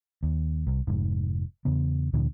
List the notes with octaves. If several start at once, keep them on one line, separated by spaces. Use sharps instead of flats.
D#2
C2
F1 G#2
E2 C#3 B3
D2 A#2 D3 E3